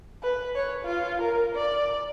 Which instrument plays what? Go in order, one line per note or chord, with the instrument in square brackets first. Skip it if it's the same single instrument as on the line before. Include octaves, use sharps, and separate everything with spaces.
[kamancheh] B4
C#5
F4
A#4
D5